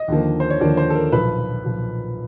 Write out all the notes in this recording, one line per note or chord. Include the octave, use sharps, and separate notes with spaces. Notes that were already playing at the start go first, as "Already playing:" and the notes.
Already playing: D#5
D#2 D3 F3 A#3
C5
C#5
D#2 D3 F3 A#3 D5
C5
A4
A#4
B1 A#2 F3 B4
B1 A#2 F3